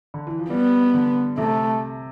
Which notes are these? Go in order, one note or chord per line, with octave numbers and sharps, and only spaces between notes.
D3
E3
F3
G3 B3
D3
C3 A3